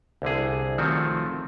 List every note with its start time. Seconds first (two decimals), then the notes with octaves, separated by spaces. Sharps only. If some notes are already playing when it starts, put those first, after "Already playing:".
0.22 C2 D3 G#4
0.78 D#3 F3 F#3 A3 C4 F#4